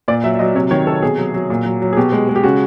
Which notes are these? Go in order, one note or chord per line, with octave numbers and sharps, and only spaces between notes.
A#2 D5
F#3 E5
E5
F#3 D#5
C3 C#5
D#3 C#5
C3 A4
B2 G#4
F#3
F#3
A#2
F#3
F#3
G#4
B2 G4
G#3
G#3
G4
C#3 F#4